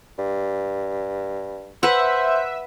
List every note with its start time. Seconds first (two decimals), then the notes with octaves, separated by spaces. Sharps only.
0.18 G2
1.83 B4 C5 E5 F#5